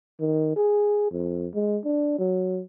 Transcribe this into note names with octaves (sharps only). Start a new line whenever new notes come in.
D#3
G#4
F2
G#3
D4
F#3